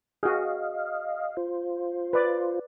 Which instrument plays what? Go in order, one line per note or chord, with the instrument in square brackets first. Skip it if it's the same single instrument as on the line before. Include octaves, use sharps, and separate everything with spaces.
[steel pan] F#4 G#4 [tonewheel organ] D#5 F5
[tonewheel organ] F4 C5
[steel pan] B4 D5